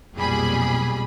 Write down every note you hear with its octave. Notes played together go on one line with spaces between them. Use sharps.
B1 F2 A#2 G3 G#4 B5